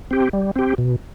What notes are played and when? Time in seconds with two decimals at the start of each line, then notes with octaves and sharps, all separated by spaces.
0.11 C4 G4
0.33 G3
0.56 C4 G4
0.78 B2